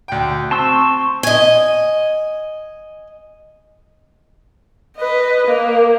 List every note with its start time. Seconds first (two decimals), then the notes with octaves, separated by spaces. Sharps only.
0.08 D2 G5
0.51 C4 A5 C6 C#6 E6
1.23 D#5 G#5
4.97 B4 D#5
5.47 A#3